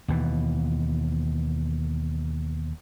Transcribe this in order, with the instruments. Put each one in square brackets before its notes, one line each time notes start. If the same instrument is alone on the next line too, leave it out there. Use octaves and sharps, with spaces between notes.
[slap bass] D#2 B2 E3